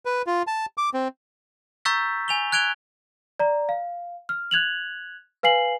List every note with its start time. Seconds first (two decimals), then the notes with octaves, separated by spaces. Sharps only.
0.05 B4
0.27 F4
0.47 A5
0.78 D6
0.94 C4
1.85 A#5 C#6 E6 G6 A6 B6
2.28 G#5 F7 G7
2.52 F#6 G#6 D7 F7 G7
3.40 D5 A#5
3.69 F5
4.29 F6
4.51 F#6 G#6 F7 F#7
5.43 B4 F5 G#5 C7 F#7